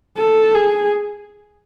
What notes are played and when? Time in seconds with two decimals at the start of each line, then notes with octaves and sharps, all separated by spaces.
0.17 A4
0.55 G#4